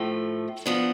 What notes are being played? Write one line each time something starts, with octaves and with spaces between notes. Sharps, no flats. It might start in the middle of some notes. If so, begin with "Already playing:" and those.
Already playing: A2 F3 A3
F3 B3 D4